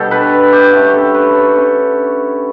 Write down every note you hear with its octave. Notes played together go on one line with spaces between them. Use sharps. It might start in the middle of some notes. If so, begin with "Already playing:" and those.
Already playing: B2 G3 D4 G4 A4
B4
G4
D3 A3 C#4 G4
A4
B4
C#5
D3 A3 C#4